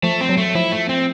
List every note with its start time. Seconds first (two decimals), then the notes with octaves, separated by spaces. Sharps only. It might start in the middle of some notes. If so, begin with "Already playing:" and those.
0.03 F3 A3
0.21 C4
0.29 F#3
0.37 A3
0.55 F3 E4
0.72 A3
0.89 C4